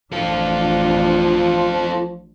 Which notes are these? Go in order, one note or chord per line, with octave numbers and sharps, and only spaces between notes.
A1 F3 D4 F4 A4